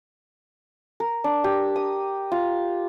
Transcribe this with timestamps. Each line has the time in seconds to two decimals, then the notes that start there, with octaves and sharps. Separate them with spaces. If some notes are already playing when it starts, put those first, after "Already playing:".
1.00 A#4
1.24 D4
1.44 G4
1.76 D#6
2.32 F4